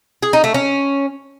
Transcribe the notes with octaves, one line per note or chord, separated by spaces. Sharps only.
G#4
D#4
A3
C#4